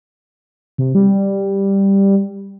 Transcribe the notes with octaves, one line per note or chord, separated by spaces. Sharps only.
C3
G3